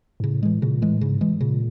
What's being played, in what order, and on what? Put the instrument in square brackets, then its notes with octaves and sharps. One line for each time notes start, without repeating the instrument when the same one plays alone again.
[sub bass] G#2
[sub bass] A2 [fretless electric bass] C#3
[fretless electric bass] E3 G#3
[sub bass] A#2 [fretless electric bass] C#3
[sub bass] A2 [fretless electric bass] E3 G#3
[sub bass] G#2 [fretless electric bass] C#3
[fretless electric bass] E3 G#3
[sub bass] A#2 [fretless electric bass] C#3